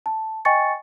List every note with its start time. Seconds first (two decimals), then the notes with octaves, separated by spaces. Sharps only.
0.06 A5
0.45 D#5 G5 G#5 C#6 A6 C#7